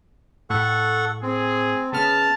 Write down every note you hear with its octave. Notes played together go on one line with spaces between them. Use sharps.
A2 A4 F#5 C#6
C4 G#4
C#3 B3 A5 F6